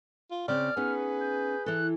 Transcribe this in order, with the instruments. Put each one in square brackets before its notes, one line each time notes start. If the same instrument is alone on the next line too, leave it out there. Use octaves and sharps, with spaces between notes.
[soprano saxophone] F4
[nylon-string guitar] C#3 C4 [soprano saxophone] D5 [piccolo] F6
[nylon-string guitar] B3 C#4 D#4 [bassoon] G#4 [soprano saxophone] B4
[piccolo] G6
[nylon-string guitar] E3 A4 [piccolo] F#6